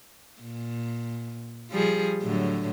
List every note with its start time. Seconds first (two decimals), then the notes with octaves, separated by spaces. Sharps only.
0.42 A#2
1.71 F3 G3 G#4
2.23 A2 D3 F#3